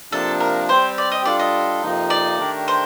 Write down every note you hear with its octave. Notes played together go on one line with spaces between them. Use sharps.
C3 F3 A#3 D4 A4
A#4
G3 C4 G4 C5
D5
D#5
G3 D4 F4 A4 D5
D#5
F2 C3 F3 A#3 D#4
D5
D#3 A3 D4 G4 A#4
C5